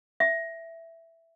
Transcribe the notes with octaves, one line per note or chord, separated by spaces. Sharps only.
E5